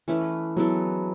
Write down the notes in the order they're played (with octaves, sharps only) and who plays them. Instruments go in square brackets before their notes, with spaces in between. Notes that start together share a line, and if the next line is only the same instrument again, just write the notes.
[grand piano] E3 [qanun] A3 C#4 E4 B4
[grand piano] F#3 [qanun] G#3 B3 E4 A4